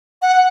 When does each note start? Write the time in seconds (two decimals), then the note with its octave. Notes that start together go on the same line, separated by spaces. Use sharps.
0.22 F#5